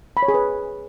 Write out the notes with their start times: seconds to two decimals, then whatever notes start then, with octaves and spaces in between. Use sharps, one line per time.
0.17 B5
0.22 C#5
0.28 G#4
0.34 B4